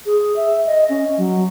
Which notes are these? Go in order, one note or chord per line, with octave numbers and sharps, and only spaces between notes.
G#4
E5
D#5
C#4
F#3